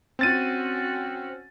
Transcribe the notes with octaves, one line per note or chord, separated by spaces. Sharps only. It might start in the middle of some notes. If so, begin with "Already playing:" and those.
C4 C#4 F#4 A6 D#7